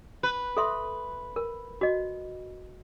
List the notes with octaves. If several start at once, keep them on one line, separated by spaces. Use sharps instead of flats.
B4
A4 E5 C6
A#4
F#4 D#5